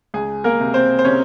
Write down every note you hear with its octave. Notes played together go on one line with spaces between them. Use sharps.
C#2 G#4
A#3 A#4
C3
C4 C5
C5
C3 C#4 C#5